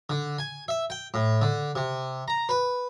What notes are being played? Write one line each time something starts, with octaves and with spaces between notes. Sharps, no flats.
D3
G#5
E5
G5
A2
D3
C3
A#5
B4